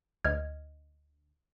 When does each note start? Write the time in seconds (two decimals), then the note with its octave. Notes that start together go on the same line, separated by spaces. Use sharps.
0.25 D2 D#5 F6 G#6